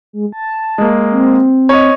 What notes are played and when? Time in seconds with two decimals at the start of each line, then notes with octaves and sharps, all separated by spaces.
0.13 G#3
0.32 A5
0.78 G#3 A#3
1.11 C4
1.69 C#5 D#5